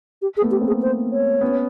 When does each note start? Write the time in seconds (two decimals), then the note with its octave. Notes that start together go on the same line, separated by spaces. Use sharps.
0.22 G4
0.37 G#4
0.42 A3 B3
0.51 G4
0.61 A#3 C4
0.67 G#4
0.82 C5
1.11 C#5
1.41 B3 C#4